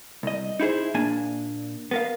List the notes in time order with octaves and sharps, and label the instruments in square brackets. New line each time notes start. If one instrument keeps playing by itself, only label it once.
[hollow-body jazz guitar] C2 D#5
D#4 E4 G#4 C5
A#2 A#3 D4 G#5
B3 A#4 F5